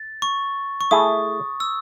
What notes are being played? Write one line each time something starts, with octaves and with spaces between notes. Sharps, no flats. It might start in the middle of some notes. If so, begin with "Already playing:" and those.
Already playing: A6
C#6
C#6
A3 E4 G#4 D#6
E6